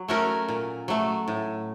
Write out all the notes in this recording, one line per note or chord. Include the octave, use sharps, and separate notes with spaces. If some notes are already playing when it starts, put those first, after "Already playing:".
Already playing: F#3
A3 C#4 F#4 A#4
A#2
F#3 A3
A2